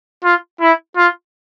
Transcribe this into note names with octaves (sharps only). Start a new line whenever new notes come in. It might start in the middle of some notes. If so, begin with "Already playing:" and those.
F4
E4
F4